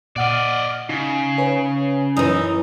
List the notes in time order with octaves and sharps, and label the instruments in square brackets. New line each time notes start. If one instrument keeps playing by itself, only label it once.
[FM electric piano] A#2 F#5 F6 [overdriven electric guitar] D5 D#5
[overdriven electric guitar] C#3 [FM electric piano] D#4
[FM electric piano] B4 C#5 G#5
[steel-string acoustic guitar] F#2 E3 [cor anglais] D#4